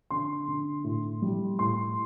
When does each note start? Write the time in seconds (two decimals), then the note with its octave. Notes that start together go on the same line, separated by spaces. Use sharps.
0.11 D3 C6
0.48 D3
0.84 A2
1.22 G3
1.59 A2 C6